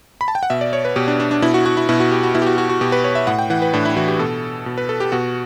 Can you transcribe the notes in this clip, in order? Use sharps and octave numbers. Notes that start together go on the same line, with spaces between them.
B5
A5
G5
F#5
B2 E5
D5
C#5
B4
B2 G4
D4
D4
D4
B2 E4
F#4
F#4
E4
B2 E4
F#4
G4
F#4
B2 E4
G4
F#4
F#4
F#4
B2 G4
B4
C#5
E5
A2 F#5
G5
E3 F#5
B4
A2 D4
E4
E3 F#4
G4
B2 A4
B2
B4
A4
G4
B2 F#4